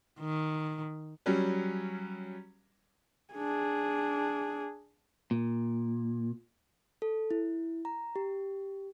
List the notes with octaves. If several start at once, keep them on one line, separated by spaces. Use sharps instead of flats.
D#3
F#3 G3 C#4
D4 G#4
A#2
A4
E4
A#5
G4